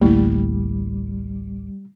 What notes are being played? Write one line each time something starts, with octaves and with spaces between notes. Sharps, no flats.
A1 D2 G3 A3 A#3 E4